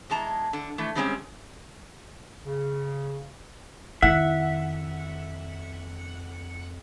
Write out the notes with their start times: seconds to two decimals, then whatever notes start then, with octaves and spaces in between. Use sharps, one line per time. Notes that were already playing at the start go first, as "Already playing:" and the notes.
0.10 E2 G#3 A5 A#5
0.53 D3
0.78 E3 A3
0.95 D3 G3 G#3 C4 C#4 G#4
2.46 C#3
4.02 F2 D#3 E4 E5 F#5